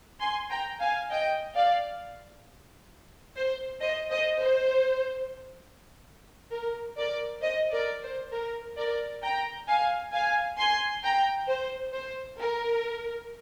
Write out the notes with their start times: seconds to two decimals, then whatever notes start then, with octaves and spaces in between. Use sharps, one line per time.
0.20 G#5 C6
0.50 G5 A#5
0.80 F5 G#5
1.11 D#5 G5
1.55 D5 F5
3.36 C5
3.81 C5 D#5
4.11 C5 D#5
4.41 C5
6.52 A#4
6.97 A#4 D5
7.42 C5 D#5
7.73 A#4 D5
8.02 C5
8.33 A#4
8.78 A#4 D5
9.23 G5 A#5
9.68 F5 G#5
10.13 F5 G#5
10.58 G#5 C6
11.03 G5 A#5
11.48 C5
11.93 C5
12.39 A#4